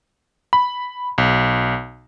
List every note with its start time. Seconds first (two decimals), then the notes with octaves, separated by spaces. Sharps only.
0.53 B5
1.18 B1